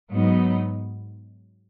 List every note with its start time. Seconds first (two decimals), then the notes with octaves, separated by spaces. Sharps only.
0.11 G#2 F#3 B3 D#4